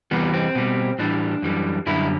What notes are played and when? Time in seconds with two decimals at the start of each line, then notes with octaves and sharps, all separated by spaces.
0.11 E2 C3 E3 G3 B3
0.33 C4
0.55 B2 G3
0.99 A2 E3 G3 D4
1.42 F#2 E3 G3
1.86 F#2 D3 G3 E4